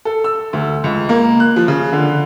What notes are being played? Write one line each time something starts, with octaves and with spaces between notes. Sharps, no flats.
A4
E6
D2
C#2
A#3
F#6
F3
C#3
D3